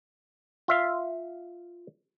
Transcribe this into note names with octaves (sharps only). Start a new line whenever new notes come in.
F4 E5 F5